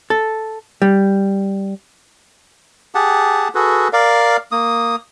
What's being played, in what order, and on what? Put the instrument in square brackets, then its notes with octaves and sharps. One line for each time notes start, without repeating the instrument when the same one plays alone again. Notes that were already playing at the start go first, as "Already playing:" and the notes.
[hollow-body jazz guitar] A4
G3
[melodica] G4 G#4 F#5 A5
F#4 G#4 A4 B4
A#4 D5 F5
A#3 D#6